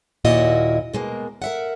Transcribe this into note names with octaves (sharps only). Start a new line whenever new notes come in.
D#2 A#2 A#3 E4 F#4 D#5
B2 G#3 A#3
A#4 E5 F#5